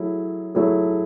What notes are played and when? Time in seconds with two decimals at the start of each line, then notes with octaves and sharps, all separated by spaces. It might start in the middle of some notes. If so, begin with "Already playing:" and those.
Already playing: F#3 A3 E4 G#4
0.55 F#3 A3 E4 G#4